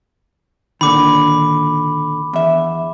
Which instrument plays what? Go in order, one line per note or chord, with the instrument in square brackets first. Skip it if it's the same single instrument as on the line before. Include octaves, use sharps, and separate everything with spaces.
[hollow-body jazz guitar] A#2 D3 D#3 [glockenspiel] B5 D6
[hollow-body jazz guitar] E2 E5